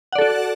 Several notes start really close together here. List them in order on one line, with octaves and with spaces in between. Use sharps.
F#5 D5 A4 F#4